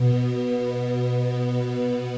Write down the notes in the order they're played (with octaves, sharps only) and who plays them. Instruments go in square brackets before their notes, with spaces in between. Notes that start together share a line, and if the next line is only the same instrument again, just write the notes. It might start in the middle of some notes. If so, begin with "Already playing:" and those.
Already playing: [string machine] B2 B3